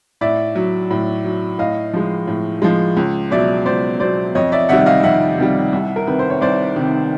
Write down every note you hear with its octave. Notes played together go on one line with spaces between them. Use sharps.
A2 D5 E5
F#3
A2
F#3
A2 D#5 F5
F3 G#3
A2
F3 G#3
C#2
B2 F#3 D5 E5
C#2 C5 D5
B2 F#3 C5 D5
F2 C#5 D#5
D5 E5
C3 D#3 G3 E5 F#5
D#5 F5
F2 E5 F#5
C3 D#3 G3
C2
A#4
C3 D#3 B4
C5
C#5
C2 C5 D5
C3 D#3